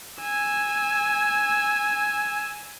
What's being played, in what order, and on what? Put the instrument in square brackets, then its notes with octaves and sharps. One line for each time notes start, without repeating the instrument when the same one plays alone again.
[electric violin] G#5 E6